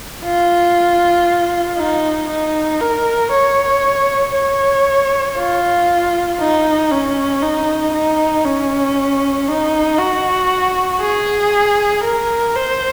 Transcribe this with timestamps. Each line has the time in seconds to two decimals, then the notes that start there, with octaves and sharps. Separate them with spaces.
0.25 F4
1.77 D#4
2.29 D#4
2.81 A#4
3.31 C#5
4.34 C#5
5.37 F4
6.39 D#4
6.91 C#4
7.42 D#4
7.94 D#4
8.45 C#4
9.48 D#4
9.99 F#4
11.01 G#4
12.04 A#4
12.56 C5